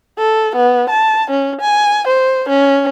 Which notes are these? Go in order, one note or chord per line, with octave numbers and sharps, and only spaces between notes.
A4
B3
A5
C#4
G#5
C5
C#4